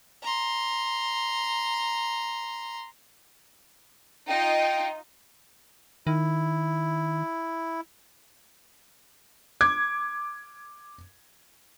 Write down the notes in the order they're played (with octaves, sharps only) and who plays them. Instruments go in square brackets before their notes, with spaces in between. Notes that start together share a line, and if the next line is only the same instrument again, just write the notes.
[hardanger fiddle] A#5 C6
[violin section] D#4 F4 D#5 [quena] G5
[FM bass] D#3 [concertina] E4
[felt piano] D6 G#6